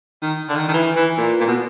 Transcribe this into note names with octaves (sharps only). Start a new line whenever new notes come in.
D#3
D3
D#3
D#3
E3
E3
A#2
A#2
B2